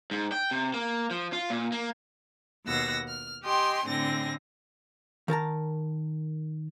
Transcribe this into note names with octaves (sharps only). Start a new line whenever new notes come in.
G#2
G5
C3
A#3
F3
F4
A#2
A#3
D#2 B2 F#5 E6 A#6
F6
G4 D#5 G5 G#5 C6
A2 D3 C4 G#5 A#6
D#3 A#4 A5 A#5